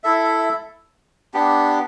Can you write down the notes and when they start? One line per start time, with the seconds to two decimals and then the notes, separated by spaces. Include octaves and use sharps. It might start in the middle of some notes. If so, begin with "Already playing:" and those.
0.04 E4 A4 E5
1.34 B3 D4 G4